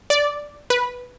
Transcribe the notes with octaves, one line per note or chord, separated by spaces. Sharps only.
D5
B4